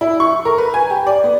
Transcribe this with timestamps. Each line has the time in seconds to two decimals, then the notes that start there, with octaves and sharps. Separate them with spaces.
0.01 E4
0.20 C#6
0.45 A#4
0.58 B4
0.74 G#5
0.90 G4
1.07 D5
1.24 B3